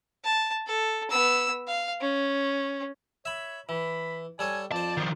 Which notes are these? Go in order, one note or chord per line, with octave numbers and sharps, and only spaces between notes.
A5
A4
B3 E6
F5
C#4
C#5 E5 B5
E3 B5
G3 A4 C#5 G#5
F2 C5 D5 A5
D#3 F3